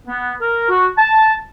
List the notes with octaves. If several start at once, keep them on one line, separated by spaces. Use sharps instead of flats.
B3
A#4
F#4
A5